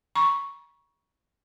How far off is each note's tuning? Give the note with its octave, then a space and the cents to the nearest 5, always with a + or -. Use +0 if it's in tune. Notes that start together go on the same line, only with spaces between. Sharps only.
A#5 +40 C#6 +0